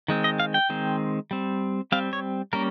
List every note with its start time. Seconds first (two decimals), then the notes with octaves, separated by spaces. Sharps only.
0.08 D#3 G#3 C4
0.24 D#5
0.40 F5
0.54 G5
0.70 D#3 G#3 C4
1.31 G3 C4
1.92 G3 C4 F5
2.13 C#5
2.53 G3 A#3 C#4 A#4